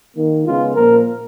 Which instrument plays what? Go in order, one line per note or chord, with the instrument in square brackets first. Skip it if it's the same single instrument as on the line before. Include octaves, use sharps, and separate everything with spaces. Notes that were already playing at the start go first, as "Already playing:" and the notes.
[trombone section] D#3 A#3
C#3 G#3 B3 F4
A#2 F3 A#3 A#4